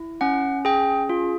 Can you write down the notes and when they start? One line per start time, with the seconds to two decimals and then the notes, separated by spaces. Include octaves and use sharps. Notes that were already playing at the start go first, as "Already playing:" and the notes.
Already playing: E4
0.21 C#4 F#5
0.65 G#4 G5
1.09 F4